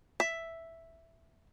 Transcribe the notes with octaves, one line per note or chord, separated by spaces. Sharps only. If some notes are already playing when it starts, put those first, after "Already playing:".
E5